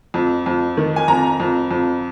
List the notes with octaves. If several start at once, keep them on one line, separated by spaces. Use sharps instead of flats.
F2
F2
D#3
G#5
F2 A#5
F2
F2